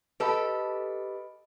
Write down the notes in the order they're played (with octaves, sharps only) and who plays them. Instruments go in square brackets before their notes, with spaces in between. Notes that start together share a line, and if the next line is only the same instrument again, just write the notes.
[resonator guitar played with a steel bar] G4 A4 [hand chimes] B4 D#5 B5